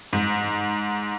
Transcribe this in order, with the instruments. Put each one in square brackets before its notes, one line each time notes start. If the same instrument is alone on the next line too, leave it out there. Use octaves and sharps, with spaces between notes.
[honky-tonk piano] G#2